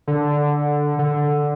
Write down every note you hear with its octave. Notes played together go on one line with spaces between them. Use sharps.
D3
D3